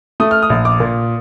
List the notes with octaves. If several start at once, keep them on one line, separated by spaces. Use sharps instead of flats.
A3 D#6
F6
D#6
A#1
D6
A#2